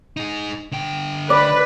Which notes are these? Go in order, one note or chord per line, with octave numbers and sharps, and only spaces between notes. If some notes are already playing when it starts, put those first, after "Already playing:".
D#4 G#4
D3 G5
B4 D5